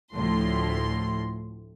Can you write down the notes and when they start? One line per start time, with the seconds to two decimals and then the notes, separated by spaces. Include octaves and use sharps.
0.13 D2 A2 F3 C6